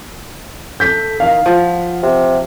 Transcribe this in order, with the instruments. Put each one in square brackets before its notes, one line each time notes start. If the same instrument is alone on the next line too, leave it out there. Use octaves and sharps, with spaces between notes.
[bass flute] A4 [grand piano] G6 B6
[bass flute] D#3 [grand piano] F5
[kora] F3 [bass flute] F#5
[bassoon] C3